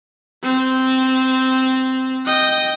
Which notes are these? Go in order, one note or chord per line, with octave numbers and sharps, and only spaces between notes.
C4
D#5 G5